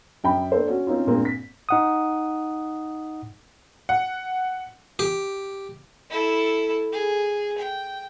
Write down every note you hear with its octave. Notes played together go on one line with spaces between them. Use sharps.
F#2 G5 B5
A#3 D4 A4 C5
C#4 F#4
C4 C#4 D#4 F4
G2 A#2 G#3 A#3 C4
B6
D#4 F#5 D#6
F#5
G4
E4 A4
G#4
G5